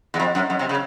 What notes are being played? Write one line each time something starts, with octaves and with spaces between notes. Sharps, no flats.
E2
F2
F#2
F#2
C3
C#3